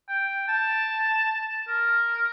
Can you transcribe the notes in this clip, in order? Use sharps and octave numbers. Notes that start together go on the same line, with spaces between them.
G5
A5
A#4